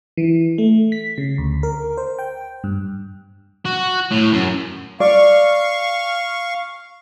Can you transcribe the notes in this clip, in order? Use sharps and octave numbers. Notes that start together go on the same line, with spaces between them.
E3
A3
B6
C#3
D2
A#4
C5
G5
G2
F#4
A2
F#2
D5 F5 C#6